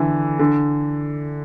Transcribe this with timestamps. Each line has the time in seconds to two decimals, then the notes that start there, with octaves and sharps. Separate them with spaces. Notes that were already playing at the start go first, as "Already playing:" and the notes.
Already playing: D3 E3
0.39 D3